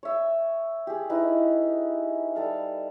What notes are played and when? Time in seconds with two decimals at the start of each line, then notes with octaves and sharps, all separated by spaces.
0.03 C#5 E5
0.87 G4 G#4
1.10 D#4 E4 B4
2.35 G3 A4 F5